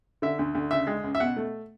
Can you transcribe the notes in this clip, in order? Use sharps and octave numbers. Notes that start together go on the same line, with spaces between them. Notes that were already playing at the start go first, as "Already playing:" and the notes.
D3 E5
D2
D2
C#3 E5
G#3
C#2
E5
B2 F#5
A3